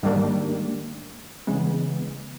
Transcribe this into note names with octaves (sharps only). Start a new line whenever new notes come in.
G#2 D#3 G3 A#3 D4
C#3 E3 G#3 B3